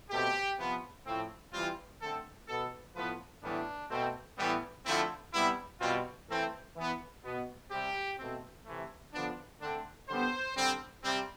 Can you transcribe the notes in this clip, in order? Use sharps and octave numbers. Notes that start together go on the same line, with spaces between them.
B2 A3 C4 G4
C3 F3 B3
A2 F3 C4
E3 G3 C4 F4
D3 A3 C4 A4
B2 B3 A4
A2 F3 B3 B4
A2 E3 G3 B3 D4
B2 A3 C4
A2 E3 G3 B3
D3 F3 A3 C4 E4
C3 G3 B3 E4
B2 G3 C4 F4
E3 A3 C4
E3 B3
B2 B3
C3 G3 C4 G4
B2 A3 C4
C3 E3 A3
D3 F3 B3 D4
D3 A3 C4 D4
D3 G3 B3 C5
D3 G3 C4
C3 G3 C4